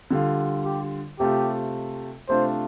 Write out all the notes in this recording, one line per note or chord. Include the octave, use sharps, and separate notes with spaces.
D3 G3 F4
G4
C3 A3 F4 G4
C3 A3 D4 F4 C5